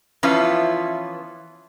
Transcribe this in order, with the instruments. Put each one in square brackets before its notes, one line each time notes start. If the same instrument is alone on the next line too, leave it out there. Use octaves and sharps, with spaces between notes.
[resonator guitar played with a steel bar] E3 F3 B3 C#4 E4 F4